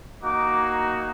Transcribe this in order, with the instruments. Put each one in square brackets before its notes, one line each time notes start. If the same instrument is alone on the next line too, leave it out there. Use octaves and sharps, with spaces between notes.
[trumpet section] A#3 D#4 F#4 D6